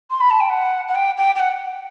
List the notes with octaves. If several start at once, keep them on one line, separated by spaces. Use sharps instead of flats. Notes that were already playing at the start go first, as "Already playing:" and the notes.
C6
B5
A5
G5
F#5
F#5
G5
G5
G5
F#5